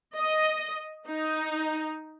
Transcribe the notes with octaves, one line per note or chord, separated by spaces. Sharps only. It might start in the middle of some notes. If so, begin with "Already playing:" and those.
D#5
D#4